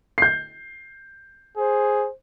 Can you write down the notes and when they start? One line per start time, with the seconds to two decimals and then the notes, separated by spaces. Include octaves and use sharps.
0.18 G6 C7
1.57 G#4 C5